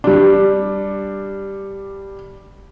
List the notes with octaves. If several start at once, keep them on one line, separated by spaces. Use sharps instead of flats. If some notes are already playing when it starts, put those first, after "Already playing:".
G3 D4